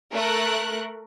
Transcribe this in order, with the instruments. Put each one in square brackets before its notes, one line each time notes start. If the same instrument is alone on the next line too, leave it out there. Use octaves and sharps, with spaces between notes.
[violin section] A3 A#4 F#6